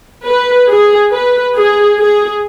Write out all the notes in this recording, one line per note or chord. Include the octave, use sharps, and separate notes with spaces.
B4
G#4
B4
G#4
G#4